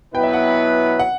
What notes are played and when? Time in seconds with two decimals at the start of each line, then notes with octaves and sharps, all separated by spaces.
0.14 B2 F#3 B3 E4 B4 G5
0.23 E5
0.33 F#5
0.99 F#5